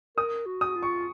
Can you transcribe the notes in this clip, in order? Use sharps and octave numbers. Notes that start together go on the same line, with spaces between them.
A#4 D#6
F#4
D#6
F4
C#6